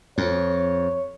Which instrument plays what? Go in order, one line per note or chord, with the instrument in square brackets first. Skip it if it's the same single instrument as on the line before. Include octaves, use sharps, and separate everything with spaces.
[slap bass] F2 [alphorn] C#5